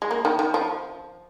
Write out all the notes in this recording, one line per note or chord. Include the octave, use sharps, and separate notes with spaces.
G#3
A#3
D#3
D#3
F3